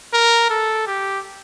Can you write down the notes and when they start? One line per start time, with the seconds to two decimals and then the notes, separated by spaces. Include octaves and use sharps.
0.13 A#4
0.50 A4
0.87 G4